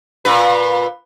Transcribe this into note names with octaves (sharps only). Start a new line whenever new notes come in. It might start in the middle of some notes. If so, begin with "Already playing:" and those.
A#2 B4